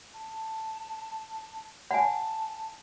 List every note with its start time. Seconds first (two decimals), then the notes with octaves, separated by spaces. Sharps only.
0.14 A5
1.91 F#5 G#5 A5